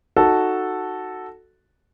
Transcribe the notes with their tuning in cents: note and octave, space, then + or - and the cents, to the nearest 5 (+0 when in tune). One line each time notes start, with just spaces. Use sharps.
D#4 +0 F#4 +0 A4 +0